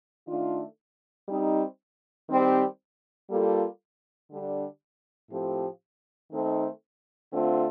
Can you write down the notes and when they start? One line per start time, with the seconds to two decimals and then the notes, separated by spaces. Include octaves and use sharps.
0.28 D#3 A3 D4 F4
1.28 G3 C4 D#4
2.29 D#3 G3 C4 G4
3.30 G3 A#3 F4 A4
4.31 D3 G3 D4
5.31 A2 F3 C4 G4
6.32 D#3 A3 C4 D#4 A4
7.33 D3 A3 C4 F4